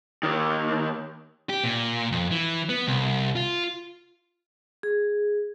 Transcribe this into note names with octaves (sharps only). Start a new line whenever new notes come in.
D#2 D#3
G4
A#2
F2
E3
B3
C2
F4
G#4